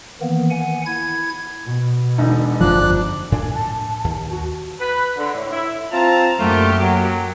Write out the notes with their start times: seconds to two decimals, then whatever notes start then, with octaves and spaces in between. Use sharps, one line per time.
0.21 D#3 E3 A#3 B3
0.50 F#5 G#5
0.86 E4 G#6
1.67 B2
2.18 E1 D3 D#4
2.61 G1 F2 F3 D4 F#6
3.32 A2 D4 G#5
3.54 A5
4.04 D#2
4.31 F#4
4.79 B4
5.17 D3
5.32 A2
5.51 E4
5.92 C4 F4 A5 A#5
6.39 F#2 D3 A3 A#3 F4 G4
6.80 F#3